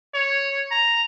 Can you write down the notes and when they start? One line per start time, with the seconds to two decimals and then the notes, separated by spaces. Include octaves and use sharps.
0.14 C#5
0.71 A#5